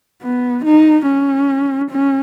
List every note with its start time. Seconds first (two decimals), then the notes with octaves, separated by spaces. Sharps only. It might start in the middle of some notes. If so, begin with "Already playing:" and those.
0.23 B3
0.65 D#4
1.06 C#4
1.90 C#4